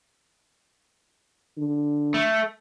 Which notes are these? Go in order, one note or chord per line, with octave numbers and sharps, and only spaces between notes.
D3
A3